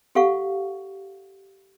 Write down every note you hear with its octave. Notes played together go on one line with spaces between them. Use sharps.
G4 A4 F5 F#5 C#6